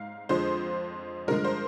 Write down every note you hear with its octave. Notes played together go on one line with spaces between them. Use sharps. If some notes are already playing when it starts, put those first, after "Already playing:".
Already playing: G#2 F5
F2 D3 F3 G#3 C5
G2 D3 F3 G#3 A#4
C5